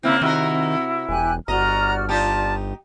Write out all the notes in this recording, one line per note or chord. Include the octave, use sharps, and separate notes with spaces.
C#3 A#3 C4 E4
C3 D#3 E4 F#4 A#4
E1 G4 G#5 F#6
G1 F#4 D5 D#5 A#5 F6
D#4 F4 G4 D5 A5